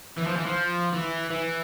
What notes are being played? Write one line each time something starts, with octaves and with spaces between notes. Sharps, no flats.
E3
F3
E3
F3
E3
E3